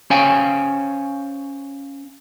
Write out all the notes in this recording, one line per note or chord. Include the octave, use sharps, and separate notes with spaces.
C#4 C5 C#5 F5 G5 G#5